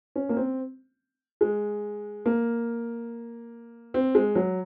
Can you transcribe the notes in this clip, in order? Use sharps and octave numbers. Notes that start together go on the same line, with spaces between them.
C#4
A#3
C4
G#3
A#3
C4
G#3
F#3